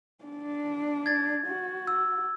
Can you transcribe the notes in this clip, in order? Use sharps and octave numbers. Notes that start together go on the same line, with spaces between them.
D4
G#6 A6
F#4
E6